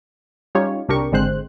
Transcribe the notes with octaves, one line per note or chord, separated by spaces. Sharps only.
G3 C#4 D#4 F4 G4 C#5
C2 C3 D4 G4 A#4 C#6
G#1 D3 G#3 C4 C5 F#6